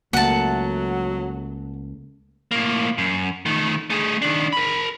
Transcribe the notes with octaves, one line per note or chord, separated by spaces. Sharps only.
C#2 F#3 A3 A#3 F#5 A5
A2 A#3
F#2
D#3 A3
A3 G#4
D#3 D4
A#4 B5